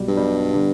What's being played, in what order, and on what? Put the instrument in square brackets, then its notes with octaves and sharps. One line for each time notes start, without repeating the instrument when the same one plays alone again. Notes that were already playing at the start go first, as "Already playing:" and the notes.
Already playing: [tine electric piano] B1 B2 G3
[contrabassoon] G2
[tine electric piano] B1 B2 G3
D3 B3 D4